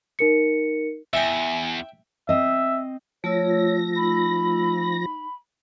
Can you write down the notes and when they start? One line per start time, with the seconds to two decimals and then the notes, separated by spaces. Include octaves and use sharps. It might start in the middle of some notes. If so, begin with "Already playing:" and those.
0.19 D#4 A#4 C#7
1.13 E2 E5 G5 G#5
2.29 C4 D#5 E5
3.24 F3 A3 F4 C#5 E6 A#6
3.96 D#4 B5